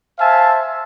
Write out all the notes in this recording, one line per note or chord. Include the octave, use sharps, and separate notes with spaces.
C5 E5 F5 G#5 A5